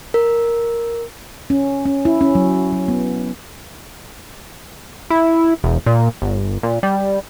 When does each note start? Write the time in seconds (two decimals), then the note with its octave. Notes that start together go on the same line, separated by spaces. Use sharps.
0.14 A#4
1.50 C#4
1.86 C#4
2.05 E4
2.21 C#4
2.35 F#3
2.72 F#3
2.88 B3
5.10 E4
5.63 E1
5.86 A#2
6.22 G1
6.63 A#2
6.83 G3